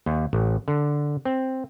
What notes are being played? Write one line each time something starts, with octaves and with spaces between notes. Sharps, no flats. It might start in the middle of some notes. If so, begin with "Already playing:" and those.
D#2
A1
D3
C4